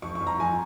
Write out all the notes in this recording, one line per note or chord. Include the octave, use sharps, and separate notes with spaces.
F2 C#6
C#6
F2
A#5
F2 G#5